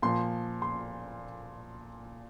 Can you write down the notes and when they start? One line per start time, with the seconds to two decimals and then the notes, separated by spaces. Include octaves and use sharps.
0.02 A#2 F3 C6
0.62 C6